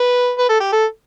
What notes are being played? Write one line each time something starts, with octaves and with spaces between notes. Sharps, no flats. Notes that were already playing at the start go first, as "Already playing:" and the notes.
Already playing: B4
B4
A4
G4
A4